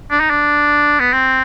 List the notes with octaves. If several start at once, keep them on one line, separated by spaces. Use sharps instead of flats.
D4
D#4
D4
B3
C4